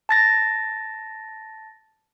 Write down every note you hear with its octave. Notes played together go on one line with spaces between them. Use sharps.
A5 A6 A#6